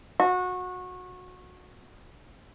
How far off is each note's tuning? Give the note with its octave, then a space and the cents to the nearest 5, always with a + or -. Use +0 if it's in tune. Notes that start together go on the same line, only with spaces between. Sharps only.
F#4 -25